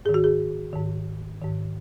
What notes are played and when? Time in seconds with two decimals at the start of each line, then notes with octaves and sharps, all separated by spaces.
0.05 G#2 D#3 G#4
0.14 F#4
0.24 G#4
0.73 G#2 D#3
1.42 G#2 D#3